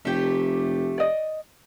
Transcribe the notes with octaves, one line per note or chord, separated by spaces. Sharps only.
F1 A3 G4
D5 D#5